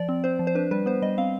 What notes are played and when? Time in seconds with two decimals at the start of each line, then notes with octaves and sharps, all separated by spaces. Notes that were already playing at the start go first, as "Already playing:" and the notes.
Already playing: F3 D5
0.09 C4
0.24 C4 C5
0.39 F3
0.47 C5
0.55 D4 B4
0.71 G3 B4
0.86 B3 C5
1.02 G3 D#5
1.18 C4 F5